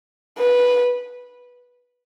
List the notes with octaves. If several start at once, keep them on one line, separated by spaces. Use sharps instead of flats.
B4